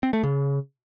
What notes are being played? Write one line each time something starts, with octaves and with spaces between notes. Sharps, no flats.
C4
A3
C#3